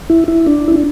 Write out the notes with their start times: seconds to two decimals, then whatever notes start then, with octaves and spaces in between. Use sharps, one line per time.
0.10 E4
0.28 E4
0.46 D4
0.68 E4
0.76 D4